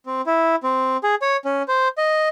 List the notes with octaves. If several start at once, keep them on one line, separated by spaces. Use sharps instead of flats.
C4
E4
C4
G#4
C#5
C#4
C5
D#5